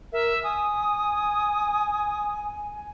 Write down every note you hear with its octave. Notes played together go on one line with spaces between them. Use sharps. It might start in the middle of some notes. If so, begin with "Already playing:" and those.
A#4 E5
G#5 D#6